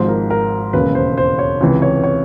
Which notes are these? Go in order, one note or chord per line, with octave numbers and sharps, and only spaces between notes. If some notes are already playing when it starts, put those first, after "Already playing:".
Already playing: G#1 G#2 F3 C5
A#4
A#4
E1 D#2 C#3 B4
C5
C5
C#5
C#2 C3 E3
C#5
C#5